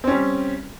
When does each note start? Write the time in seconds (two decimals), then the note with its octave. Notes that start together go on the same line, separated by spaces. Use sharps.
0.04 C4
0.07 C#4
0.11 G3